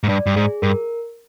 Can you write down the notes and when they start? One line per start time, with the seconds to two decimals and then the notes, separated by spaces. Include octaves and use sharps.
0.03 G#2
0.09 G2 D5
0.26 G2
0.36 G#2 G#4
0.62 G2 A#4